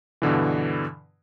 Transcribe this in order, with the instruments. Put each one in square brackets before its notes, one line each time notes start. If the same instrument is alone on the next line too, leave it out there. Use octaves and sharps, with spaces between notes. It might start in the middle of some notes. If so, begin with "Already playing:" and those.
[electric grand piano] G2 B2 D3 E3